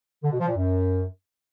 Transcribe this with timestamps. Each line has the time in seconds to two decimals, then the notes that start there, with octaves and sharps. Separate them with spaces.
0.23 D3
0.31 B2
0.40 F3
0.48 A#2
0.56 F#2